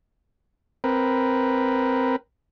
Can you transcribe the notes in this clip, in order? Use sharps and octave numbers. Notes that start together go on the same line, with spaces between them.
C4 A#4 B4